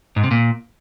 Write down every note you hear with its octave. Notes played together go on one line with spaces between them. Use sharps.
G#2
C3
A#2